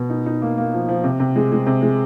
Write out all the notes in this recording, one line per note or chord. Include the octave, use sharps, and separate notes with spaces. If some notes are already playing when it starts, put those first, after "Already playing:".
Already playing: B2
D#4
D#4
A#3
A#3
F3
F3
C3
C3
G#3
G#3
C3
G#3